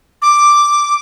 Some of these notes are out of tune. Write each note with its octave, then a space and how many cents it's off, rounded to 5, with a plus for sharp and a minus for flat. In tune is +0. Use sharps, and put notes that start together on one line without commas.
D6 +0